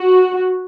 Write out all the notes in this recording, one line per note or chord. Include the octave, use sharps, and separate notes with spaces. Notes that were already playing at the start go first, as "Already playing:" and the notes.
Already playing: F#4